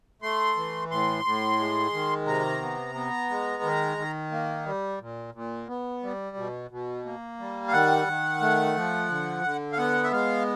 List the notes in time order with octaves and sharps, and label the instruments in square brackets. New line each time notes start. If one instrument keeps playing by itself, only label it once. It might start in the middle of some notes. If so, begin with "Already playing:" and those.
[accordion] A3 C6
E3
A2 C6
A2
G#3
D#3
C3 A#5
B3
B3
G#3
D#3
D#3
A#3
G3
A#2
A#2
B3
G3
B2
B2
A#3
G3
F5
D#3 F#5
D#3
A3
F3
D3
D3
F5
B3 F#5
E5
G#3 F5